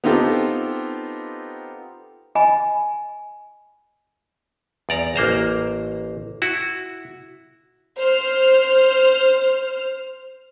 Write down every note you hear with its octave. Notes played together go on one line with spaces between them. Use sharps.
B3 C4 D#4 F4 G4 A4
D#5 G#5 B5
E2 D5 A#5
A1 A#3 C5 A#5
E4 F#4
C5 F6